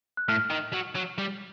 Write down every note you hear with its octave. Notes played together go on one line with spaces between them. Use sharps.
F#6
A2 F6
D#3
F#3
F#3
G3